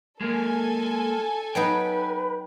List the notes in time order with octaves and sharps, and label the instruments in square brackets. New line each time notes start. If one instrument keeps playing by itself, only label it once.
[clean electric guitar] G#3 A#3 [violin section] A4 G#5
[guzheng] F#3 B3 D#4 [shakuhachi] B4 [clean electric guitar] G5